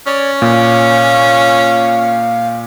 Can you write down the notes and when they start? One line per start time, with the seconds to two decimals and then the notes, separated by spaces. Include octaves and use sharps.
0.06 C#4 C#5 D5
0.42 A#2 F5